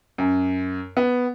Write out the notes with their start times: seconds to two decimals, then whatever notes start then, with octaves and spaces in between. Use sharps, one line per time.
0.18 F#2
0.97 B3